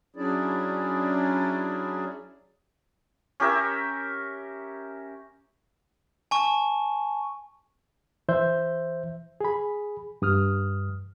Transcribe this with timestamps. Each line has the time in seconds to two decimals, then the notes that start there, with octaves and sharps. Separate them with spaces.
0.16 F#3 C#4 D4 E4 G#4 D5
3.40 C#4 G4 A#4 E5
6.31 G#5 A5 C#6
8.29 E3 C5 E5 G6
9.41 G#4 B5
10.22 G2 D#6 F6